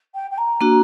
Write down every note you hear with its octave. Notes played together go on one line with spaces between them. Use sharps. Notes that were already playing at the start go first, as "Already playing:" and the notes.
G5
G5
A#5
A#3 D4 F#4